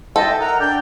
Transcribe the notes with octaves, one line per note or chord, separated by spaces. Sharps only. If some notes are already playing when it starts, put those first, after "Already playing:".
A4 D#5 E5 G5
A#4 F#5 A#5
D4 D5 G5 G6